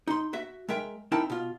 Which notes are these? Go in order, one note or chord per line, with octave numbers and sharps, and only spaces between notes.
D#4 C6
F#4 E5
G#3 A#4 E5 G5
C4 D#4 E4 A#4 G5 A5
B2 F4